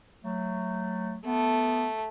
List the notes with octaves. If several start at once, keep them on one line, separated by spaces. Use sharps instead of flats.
F#3 A3
A3 B3